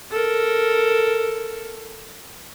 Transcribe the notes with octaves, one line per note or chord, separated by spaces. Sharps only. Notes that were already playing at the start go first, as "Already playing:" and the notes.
A4 A#4